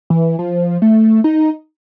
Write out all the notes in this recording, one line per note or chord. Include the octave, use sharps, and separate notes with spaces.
E3
F3
A3
D#4